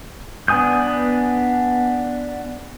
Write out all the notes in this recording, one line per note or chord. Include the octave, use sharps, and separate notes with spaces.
B3 D4 G#5 D#6 G6